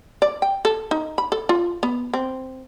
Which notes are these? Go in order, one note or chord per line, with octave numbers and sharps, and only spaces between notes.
D5
G5
A4
D#4
B5
A4
F4
B3
C4